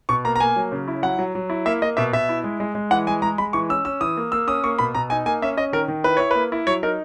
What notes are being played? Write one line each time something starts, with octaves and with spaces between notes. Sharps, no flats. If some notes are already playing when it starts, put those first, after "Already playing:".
B2 C#6
A#3 A#5
A#5
A#3 G#5
F#3
C#3
E4
F#3 F#5
F#3
F#3
E4
A#3 E5
A#3 D#5
B2 E5
B2 E5
E4
G#3
G#3
G#3
E3 F#5
G#3 G#5
G#3 A#5
G#3 B5
E3 C#6
C#4 E6
C#4 E6
E3 D#6
A#3
A#3 E6
C#4 D#6
A#3 C#6
B2 B5
B2 A#5
D#4 G#5
A#3 G#5
C#4 E5
C#4 D#5
D#3 A#4
D#3
E4 B4
E4 C#5
A#3 B4
E4
F#3 C#5
D#4 A#4